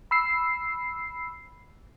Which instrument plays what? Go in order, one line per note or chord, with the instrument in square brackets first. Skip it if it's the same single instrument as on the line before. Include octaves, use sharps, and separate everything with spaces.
[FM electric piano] B5 E6 C7